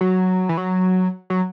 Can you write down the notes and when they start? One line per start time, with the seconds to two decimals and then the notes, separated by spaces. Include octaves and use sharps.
0.01 F#3
0.49 E3
0.57 F#3
1.30 F#3